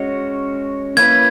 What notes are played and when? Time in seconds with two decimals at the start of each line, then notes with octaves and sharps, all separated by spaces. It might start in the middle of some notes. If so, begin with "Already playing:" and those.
Already playing: G#3 C#4 F#4 C#5
0.97 A#3 C#4 E4 B4 G#6